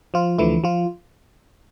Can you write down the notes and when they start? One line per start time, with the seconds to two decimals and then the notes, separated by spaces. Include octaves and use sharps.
0.14 F3 F4
0.38 D2 D3 E3 F3 A3 E4
0.64 F3 F4